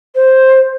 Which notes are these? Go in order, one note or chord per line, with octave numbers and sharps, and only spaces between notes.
C5